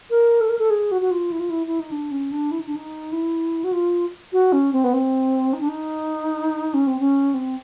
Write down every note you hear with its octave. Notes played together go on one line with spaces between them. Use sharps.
A#4
A4
A#4
A4
G#4
F#4
F#4
F4
E4
F4
E4
E4
D#4
D4
C#4
D4
E4
D#4
D4
D#4
E4
F#4
F4
F#4
C#4
C4
B3
C4
D#4
D4
D#4
C#4
C4
C#4
C4